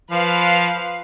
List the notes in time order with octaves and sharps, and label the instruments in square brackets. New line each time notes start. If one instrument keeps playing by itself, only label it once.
[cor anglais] F3 [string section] B4 F5